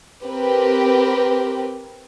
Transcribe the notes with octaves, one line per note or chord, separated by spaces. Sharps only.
C4 G4 A#4 B4